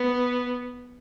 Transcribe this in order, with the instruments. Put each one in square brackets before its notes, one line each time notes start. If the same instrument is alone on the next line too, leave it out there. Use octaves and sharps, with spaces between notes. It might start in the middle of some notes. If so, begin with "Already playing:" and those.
Already playing: [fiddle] B3